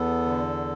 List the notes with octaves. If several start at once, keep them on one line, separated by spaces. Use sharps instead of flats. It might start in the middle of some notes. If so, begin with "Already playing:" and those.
Already playing: E2 B3 A4
D3